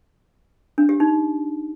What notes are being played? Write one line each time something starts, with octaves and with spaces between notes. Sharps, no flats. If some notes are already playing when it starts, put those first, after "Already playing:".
D4
G4
D#4